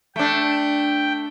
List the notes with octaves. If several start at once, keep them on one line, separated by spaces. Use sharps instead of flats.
A3 D4 G5